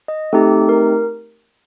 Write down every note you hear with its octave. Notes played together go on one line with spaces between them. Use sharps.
D#5
A3 C4 D#4 G4 A4
A#4